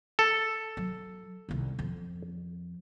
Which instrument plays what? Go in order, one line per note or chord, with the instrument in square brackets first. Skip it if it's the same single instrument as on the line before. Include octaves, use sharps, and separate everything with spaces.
[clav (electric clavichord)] A4
[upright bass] F#3
C2 D#3
F2